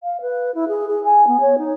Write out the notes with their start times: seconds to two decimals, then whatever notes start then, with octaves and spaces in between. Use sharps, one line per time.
0.03 F5
0.21 B4
0.55 E4
0.68 G#4
0.88 G#4
1.04 G#5
1.27 B3
1.40 C#5
1.58 D#4